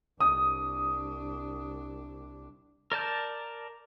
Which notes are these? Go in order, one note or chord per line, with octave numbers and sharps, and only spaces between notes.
C2 D4 D#6
A#4 D5 A5 G6